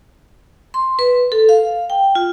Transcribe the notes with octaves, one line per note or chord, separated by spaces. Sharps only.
C6
B4
A4
F5
G5
F4